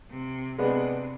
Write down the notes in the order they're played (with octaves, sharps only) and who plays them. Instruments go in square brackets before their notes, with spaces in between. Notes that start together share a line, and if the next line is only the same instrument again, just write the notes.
[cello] C3
[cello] C3 [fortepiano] G#3 B3 D4